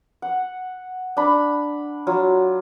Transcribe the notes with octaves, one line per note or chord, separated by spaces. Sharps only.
F#5
D4 B5
F#3 F4